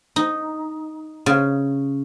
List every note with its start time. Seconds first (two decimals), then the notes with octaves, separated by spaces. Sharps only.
0.16 D#4
1.26 C#3